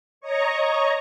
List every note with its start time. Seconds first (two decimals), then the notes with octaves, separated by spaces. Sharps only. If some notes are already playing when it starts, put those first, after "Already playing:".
0.21 C#5 D#5 A#5 C#6